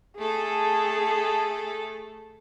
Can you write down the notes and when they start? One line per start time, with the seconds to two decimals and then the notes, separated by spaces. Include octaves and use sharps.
0.19 A3 G#4 A4